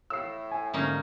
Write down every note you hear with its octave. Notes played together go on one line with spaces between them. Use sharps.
A2 E6 C7
G#5
G#2 D3 A#3 C#4 D#4